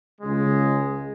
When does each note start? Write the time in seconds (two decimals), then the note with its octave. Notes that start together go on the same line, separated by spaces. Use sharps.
0.21 C#2 C#3 G#3